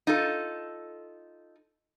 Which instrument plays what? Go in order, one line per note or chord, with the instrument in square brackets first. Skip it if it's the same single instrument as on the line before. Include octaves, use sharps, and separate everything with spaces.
[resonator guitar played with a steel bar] D#4 F4 A4